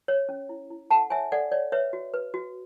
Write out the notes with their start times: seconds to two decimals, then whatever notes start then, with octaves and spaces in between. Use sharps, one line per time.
0.08 C#5
0.29 C#4
0.49 E4
0.70 E4
0.91 A4 F#5 A5
1.10 C#5 E5 G#5
1.32 A4 D5 F#5
1.52 C#5 D5
1.72 B4 C#5 E5
1.93 F#4
2.14 B4
2.34 F#4